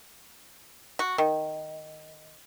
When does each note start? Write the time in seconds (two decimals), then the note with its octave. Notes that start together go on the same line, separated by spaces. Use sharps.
0.99 F#4
1.18 D#3